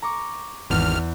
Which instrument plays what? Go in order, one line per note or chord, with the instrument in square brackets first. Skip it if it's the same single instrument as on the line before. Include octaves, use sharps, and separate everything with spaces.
[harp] A#5 C#6 D6
[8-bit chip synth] G#1 F6 [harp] E2